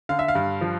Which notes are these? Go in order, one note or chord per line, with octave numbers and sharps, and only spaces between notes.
D3 F5
E5
F5
G2
F3